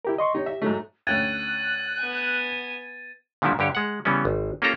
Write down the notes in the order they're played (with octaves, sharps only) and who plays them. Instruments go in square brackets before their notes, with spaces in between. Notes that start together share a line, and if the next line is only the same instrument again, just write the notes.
[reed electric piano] E4 G4 A#4
D#5 C6 C#6
[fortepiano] D#4 C#5 [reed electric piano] G4
[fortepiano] E5
G#2 F#3 A3
[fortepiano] D2 C#4 G5 [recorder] F#6 [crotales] G#6 A6 D#7
[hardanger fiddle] B3 G#5
[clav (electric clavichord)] A#2 D3 D#3 F3 G3 E4
G2 D3 G4 C#5
G#3 F#5
C#3 E3 G3 B3 C#4
G#1
A#3 C#4 F4 G4 A4 A#5